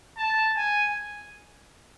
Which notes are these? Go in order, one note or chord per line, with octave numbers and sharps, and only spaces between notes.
A5
G#5